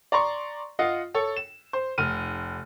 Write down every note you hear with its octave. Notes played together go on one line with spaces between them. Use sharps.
D5 A#5 C6 C#6
F4 D#5 F#5
A4 C#5
E7
C5
F1 F6 D#7